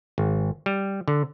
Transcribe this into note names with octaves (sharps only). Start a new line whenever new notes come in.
G#1
G3
D3